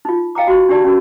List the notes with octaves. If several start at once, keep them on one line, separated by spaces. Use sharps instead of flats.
D#4 F4
D#5 F5 G5 G#5 A#5 D6
F#4 C6
D4 F#4 G4 D5 A5
C#4 F#4 A#4